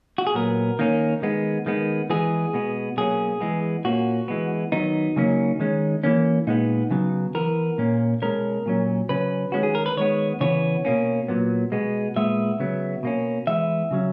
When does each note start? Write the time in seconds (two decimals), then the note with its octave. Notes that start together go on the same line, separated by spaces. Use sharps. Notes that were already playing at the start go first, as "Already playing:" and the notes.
0.18 F#4
0.27 G#4
0.34 A#2 F#3 B3 A#4
0.79 D#3 A#3 C#4
1.22 D#3 G#3 B3
1.66 D#3 G#3 B3
2.10 E3 G#3 B3 G#4
2.53 B2 G#3 B3
2.97 B2 F#3 A#3 C#4 G#4
3.41 E3 G#3 B3
3.85 A#2 A#3 C#4 F#4
4.28 E3 G#3 B3
4.72 D#3 F#3 B3 D#4
5.16 C#3 F#3 A#3 C#4
5.60 D#3 G#3 C#4
6.04 E3 A#3 C#4
6.47 A#2 G#3 B3 D#4
6.91 C#3 F#3 B3
7.35 E3 B3 A#4
7.78 A#2 A#3 C#4
8.22 B2 G#3 C#4 A#4
8.66 A#2 F#3 C#4
9.09 C#3 F#3 C#4 B4
9.52 D#3 G#3 C#4 F#4
9.63 G#4
9.75 A#4
9.86 B4
9.97 D#3 G#3 B3 C#5
10.41 C#3 E3 B3 C#5
10.85 B2 A#3 C#4
11.28 A#2 F#3 B3
11.72 B2 G#3 B3
12.16 A#2 G#3 B3 E5
12.59 C#3 F#3 B3
13.03 B2 A#3 C#4
13.47 E3 G#3 B3 E5
13.91 C#3 F#3 C#4